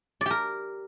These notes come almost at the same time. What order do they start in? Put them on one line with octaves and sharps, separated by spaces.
D5 G4 A#4